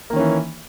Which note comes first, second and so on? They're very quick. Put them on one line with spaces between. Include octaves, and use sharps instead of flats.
A#3 D#3 C#4 E3